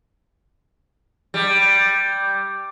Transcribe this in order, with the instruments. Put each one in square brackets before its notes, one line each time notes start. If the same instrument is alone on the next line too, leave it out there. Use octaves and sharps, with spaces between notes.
[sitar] G3